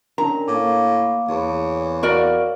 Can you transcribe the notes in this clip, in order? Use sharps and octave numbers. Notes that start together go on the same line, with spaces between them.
C#4 D4 A#4 A#5
A2 A#3 D6
E2 C#5
F#4 A#4 D5 F5